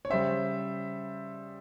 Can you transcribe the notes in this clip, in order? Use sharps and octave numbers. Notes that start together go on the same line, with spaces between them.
C#5
C#3 G3 C5 E5